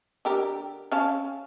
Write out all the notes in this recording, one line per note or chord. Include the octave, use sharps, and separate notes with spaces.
D3 G4 A#4
C#4 F5 A5